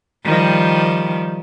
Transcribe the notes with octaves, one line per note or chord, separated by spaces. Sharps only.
D#3 F3 G3